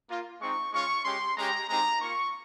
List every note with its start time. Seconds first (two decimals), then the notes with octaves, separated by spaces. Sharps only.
0.08 A#3 F4
0.40 G#3 C4 D#4 C#6
0.72 G#3 C#4 F4 C#6
1.04 G#3 C#4 G4 C6
1.36 G#3 C#4 G4 A#5
1.68 G#3 C4 D#4 G4 A#5
2.01 A#3 F4 C#6